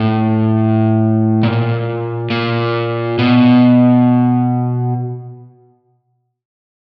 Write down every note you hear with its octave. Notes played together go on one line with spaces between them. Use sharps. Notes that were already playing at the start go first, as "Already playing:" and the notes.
Already playing: A2
A#2
A#2
B2